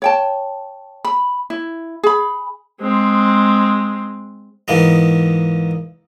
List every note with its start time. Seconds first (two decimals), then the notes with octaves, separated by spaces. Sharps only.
0.02 C#5 G5 A5
1.05 B5
1.50 E4
2.03 G#4 B5
2.81 G#3 C4
4.68 E2 G#2 A#3 B3